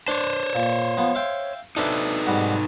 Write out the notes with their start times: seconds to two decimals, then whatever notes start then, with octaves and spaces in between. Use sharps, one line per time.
0.08 D4 C5 C#5
0.55 A#2
0.97 F3 B3
1.15 E5 F5 G5
1.77 D4 D#4 A4 B4 C5 E5
2.27 G#2 G3 F#4